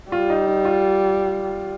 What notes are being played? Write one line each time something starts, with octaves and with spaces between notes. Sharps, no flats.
G3 F4
D#4
D#4
F4